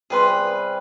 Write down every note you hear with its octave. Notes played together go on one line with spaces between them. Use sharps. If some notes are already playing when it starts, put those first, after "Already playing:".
C3 G3 G#4 B4 C6